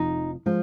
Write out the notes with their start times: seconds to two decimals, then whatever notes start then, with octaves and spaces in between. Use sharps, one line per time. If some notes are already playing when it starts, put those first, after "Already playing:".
Already playing: F1 F2 F3 D#4
0.46 F3 G#3